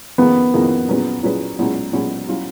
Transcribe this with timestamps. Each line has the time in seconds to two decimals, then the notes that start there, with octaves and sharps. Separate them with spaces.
0.18 F2 D#3 A#3 B3 C#4 G#4
0.53 F2 D#3 A#3 C#4 G#4
0.88 A#2 F#3 C#4 G#4 B4
1.23 A#2 F#3 C#4 G#4 B4
1.59 B1 A#2 G#3 C#4
1.93 B1 A#2 G#3 C#4
2.29 F#3 C#4 F4